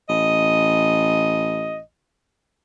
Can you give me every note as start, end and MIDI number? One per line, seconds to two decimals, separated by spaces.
0.09 1.82 33
0.09 1.79 75